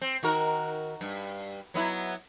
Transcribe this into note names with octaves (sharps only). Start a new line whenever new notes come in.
C4
D#3 F#4 A#4
G2
F#3 B3 E4